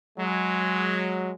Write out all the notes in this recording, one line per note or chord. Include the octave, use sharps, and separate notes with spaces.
F#3 G#3